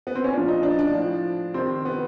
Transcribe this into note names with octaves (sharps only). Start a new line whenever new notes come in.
B3
C4
C#4
A#2 F3 D4
D#4
D4
D4
A2 F3
C3 D#3 C4
B3